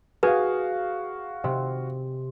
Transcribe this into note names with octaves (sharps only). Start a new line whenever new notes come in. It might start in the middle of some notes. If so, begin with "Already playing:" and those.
F#4 G#4 B4 F5
C3